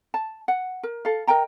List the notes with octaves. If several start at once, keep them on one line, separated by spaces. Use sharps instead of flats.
A5
F#5
A#4
A4 F5
A#4 D#5 G5 A#5